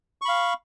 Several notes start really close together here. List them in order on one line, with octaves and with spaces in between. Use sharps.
C#6 B5 F5